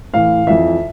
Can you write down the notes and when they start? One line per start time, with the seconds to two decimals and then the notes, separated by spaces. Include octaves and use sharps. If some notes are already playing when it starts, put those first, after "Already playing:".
0.14 A2 E3 F5
0.47 F2 E3 E5